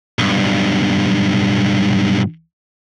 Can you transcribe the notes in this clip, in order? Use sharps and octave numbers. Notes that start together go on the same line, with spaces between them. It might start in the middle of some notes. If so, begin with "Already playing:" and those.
B1 G2